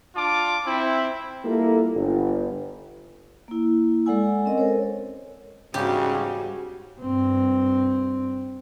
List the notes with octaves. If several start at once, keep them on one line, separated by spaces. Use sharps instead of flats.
D4 F4 A5 D6
C4 E4
G3 A#3 E4 F4 A4
G1
A#3 E4
G#3 A4 D5 F#5 G#5 E6
C4 C#4 A#4 D#5
A4 A#4 C5 C#5
E2 G#2 C#3 G3 F#4 G4
G2 C4